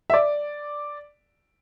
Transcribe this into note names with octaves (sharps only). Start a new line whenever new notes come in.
E5
D5